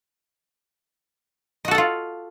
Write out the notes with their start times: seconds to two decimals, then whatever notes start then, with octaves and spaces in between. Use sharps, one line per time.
1.65 D#5
1.68 F#4
1.71 A4
1.75 F#5
1.78 F4